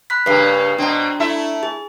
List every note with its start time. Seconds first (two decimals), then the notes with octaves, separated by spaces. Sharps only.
0.10 B5 F#6 B6
0.26 G2 C#3 A#3 B4 F5 C7
0.79 B2 C4 D4 A#5
1.20 A3 E4 E5
1.63 G#4